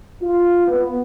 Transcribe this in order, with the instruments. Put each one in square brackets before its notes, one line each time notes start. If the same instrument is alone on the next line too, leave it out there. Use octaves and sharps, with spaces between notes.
[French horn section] F4
B3